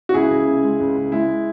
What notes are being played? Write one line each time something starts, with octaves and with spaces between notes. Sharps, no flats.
F#4
C#2 E4 G#4
C#2
C#3
G#3
C#2
C#2
G#3 E4